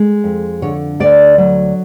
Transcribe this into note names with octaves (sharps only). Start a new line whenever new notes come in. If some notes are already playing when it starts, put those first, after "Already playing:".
Already playing: G#3
F2
D3 C#5
D2 D5
F#3